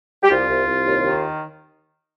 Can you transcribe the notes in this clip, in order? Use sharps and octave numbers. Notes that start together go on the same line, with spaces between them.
G4
C2 F4
C2
C2
D#2
D#3